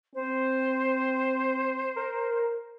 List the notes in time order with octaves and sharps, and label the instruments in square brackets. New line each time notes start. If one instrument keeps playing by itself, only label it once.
[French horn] C4 [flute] C5
[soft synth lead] A#4